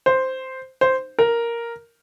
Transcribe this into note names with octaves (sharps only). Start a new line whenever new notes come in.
C5
C5
A#4